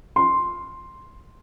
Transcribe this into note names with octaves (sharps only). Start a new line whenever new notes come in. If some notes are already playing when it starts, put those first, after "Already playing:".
C6